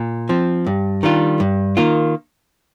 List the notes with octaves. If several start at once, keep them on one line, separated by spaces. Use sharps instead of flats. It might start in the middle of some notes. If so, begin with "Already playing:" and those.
Already playing: A#2
F3 C4
G2
D#3 G3 D4 F4
G2
D#3 A#3 F4